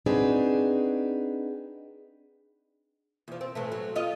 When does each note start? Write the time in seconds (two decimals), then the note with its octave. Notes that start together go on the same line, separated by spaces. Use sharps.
0.06 C4 D4 D#4 F#4 G#4 B4
3.28 E2 F3
3.41 C4
3.55 A2 E3 A3
3.72 F#3
3.96 F4 D#5